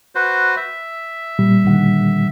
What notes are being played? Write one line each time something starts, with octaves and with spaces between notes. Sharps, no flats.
F#4 B4 C5
E5
A#2 G3
D3 D#3 F#5